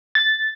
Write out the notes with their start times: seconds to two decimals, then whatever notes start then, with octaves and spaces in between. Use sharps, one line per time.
0.15 A6